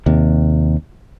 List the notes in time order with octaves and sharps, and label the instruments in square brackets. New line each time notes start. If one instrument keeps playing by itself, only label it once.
[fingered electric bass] D#2 C3